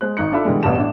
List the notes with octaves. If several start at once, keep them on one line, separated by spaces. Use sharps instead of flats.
G#3 C5 F#6
G#1 D#4 F#6 C#7
D4 F4 A4 E5 B5
B2 D3 E3 G3 G#3
E1 A1 B2 G3 A5 E7
A2 D4